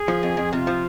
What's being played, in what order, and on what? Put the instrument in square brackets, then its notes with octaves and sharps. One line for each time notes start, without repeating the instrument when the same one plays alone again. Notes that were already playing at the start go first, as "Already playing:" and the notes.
Already playing: [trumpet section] G#4
[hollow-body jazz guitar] F3
F2
F2
[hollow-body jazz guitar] C3 [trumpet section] F4
[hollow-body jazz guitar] F3